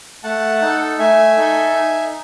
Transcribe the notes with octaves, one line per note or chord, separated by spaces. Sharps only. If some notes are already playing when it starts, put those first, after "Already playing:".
A3 F#5 A5
D#4 A4
A3 E5 G#5
D#4 A4
D#4